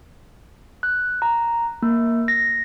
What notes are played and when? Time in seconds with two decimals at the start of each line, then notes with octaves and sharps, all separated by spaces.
0.83 F#6
1.22 A#5
1.82 A#3
2.28 A#6